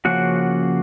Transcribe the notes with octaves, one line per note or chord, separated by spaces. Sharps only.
C#3 F3 A#3 C#4 F#4 F#5